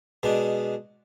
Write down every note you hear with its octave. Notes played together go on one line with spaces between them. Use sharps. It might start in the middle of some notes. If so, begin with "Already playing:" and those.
B2 G#3 D4